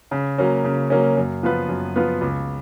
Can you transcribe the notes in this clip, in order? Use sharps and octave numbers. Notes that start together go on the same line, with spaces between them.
C#3
F#3 A#3 C#4
C#3
F#3 A#3 C#4
F#2
F3 B3 F4 B4
F#2
F3 B3 F4 B4
C#2